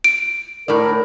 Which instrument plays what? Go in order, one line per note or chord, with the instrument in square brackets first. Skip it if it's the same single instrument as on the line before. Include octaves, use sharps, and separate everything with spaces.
[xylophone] D7
[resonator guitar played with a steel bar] A2 D5 [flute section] A#4